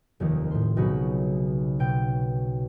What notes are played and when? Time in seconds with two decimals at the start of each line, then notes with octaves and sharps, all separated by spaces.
0.20 F1 D#2 D#3
0.51 A2 C6
0.77 B1 C#3 D#4 F#4 B5
1.79 B2 G5